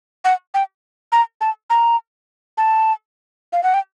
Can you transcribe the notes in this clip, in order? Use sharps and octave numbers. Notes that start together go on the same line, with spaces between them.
F#5
G5
A#5
A5
A#5
A5
F5
F#5
G5